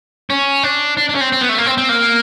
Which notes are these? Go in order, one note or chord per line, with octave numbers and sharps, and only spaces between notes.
C#4
D4
D4
D4
C#4
C4
C4
B3
A3
A#3
C4
C4
A#3